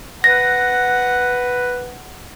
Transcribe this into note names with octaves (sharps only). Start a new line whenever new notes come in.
B4 F#5 A#6